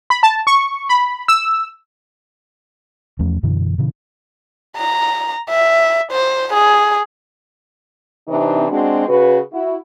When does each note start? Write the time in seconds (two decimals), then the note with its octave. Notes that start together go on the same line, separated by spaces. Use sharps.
0.10 B5
0.23 A5
0.47 C#6
0.89 B5
1.28 E6
3.19 E2 F3 A3 C#4
3.43 F#2 B2 D3 E3
3.78 A#2 C#3 E3
4.77 A#5
5.50 E5
6.12 C5
6.53 G#4
8.28 C3 E3 C4 D4 D#4
8.69 G#3 C4 D4 F#4
9.08 C#3 F#4 B4
9.52 E4 F#4